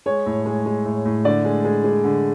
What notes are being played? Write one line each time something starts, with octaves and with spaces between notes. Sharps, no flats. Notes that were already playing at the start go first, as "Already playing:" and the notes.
G#3 C#5
A2
G#3
G#3
A2
A2
D3 D5
G#3
G#3
G#3
D3